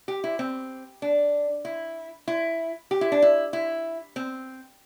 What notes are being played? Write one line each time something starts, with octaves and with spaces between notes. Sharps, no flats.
G4
E4
C4
D4
E4
E4
G4
E4
D4
E4
E4
C4